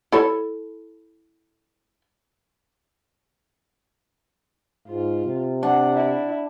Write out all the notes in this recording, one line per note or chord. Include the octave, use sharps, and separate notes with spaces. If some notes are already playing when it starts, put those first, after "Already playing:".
E4 A4 C#5
G#2 F4
C3
D4 F#5
E4